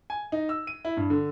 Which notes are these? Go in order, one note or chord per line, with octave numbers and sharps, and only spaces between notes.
G#5
D#4
E6
D#7
E4
G2
D3